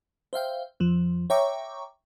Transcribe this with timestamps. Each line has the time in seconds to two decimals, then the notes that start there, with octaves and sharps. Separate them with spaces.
0.33 C5 E5 F5 G5
0.80 F2 F3
1.30 C#5 E5 G5 A#5 C#6 D6